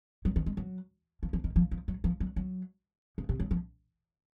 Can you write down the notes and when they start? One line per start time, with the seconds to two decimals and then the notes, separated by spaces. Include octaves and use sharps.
0.25 F#3
0.36 D#3
0.46 G#3
0.57 F#3
1.23 F3
1.33 F3
1.44 D#3
1.56 F3
1.71 F3
1.88 F#3
2.04 F3
2.20 F#3
2.36 F#3
3.18 C#3
3.29 C3
3.40 F#3
3.51 F3